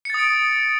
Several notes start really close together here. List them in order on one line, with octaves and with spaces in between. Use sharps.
C#7 A6 D#6 D7